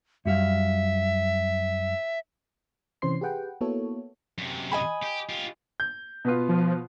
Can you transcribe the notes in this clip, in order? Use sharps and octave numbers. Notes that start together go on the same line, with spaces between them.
F#2 G3 E5 F5
C3 E3 C#4 C5 C6 C7
G4 G#4 B4 F#5 G5
A#3 B3 E4 F#4 A4 C#5
F#2 C3
D#5 G#5 B5
G4
F4 G4
G6
B2 B3 F4
F3